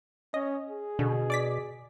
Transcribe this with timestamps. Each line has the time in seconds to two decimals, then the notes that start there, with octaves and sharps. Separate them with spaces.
0.34 C#4 D#5
0.69 G#4
0.99 B2 D3
1.30 D5 D6 B6